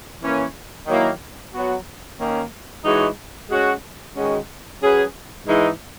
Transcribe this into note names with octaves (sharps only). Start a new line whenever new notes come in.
E3 A#3 C#4
D#3 F#3 A#3 E4
F#3 B3 F#4
D#3 A#3 C#4
E3 G#3 D#4 F#4 C#5
G#3 C#4 F#4
D#3 G#3 C#4 F#4
F#3 C#4 G#4 B4
G#2 E3 G#3 D#4